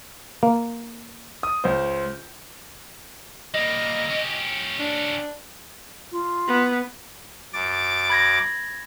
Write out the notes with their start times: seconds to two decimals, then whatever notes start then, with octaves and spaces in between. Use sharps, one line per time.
0.43 A#3
1.43 D#6
1.64 C#2 C5
3.54 G3 A#3 D#5
4.10 C#4 G4
4.79 D4
6.12 F4
6.48 B3
7.53 F#2 D6 A6
8.10 B5 G#6 A#6